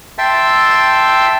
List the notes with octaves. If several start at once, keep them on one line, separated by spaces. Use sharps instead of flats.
E5 G5 A5 C6 E6